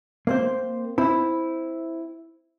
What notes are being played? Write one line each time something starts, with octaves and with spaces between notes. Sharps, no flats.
A#3 C4 C5
C4 E4